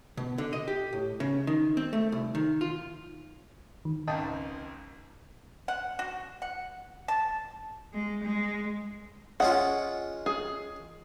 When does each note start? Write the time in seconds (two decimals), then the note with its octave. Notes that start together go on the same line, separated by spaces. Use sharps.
0.17 B2
0.38 D3
0.53 D#5
0.68 G4
0.93 A2
1.20 C#3
1.47 D#3
1.77 C4
1.93 A3
2.12 C2
2.35 D#3
2.61 F4
3.85 D#3
4.08 G#1 C#2 G#2 D#5 G5 A5
5.68 F#5
5.99 F#4
6.42 F#5
7.08 A5
7.93 G#3
8.24 G#3
9.40 G#3 C#4 F4 F#5
10.26 G#4